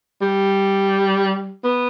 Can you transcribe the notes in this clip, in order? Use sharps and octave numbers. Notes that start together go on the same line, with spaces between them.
G3
B3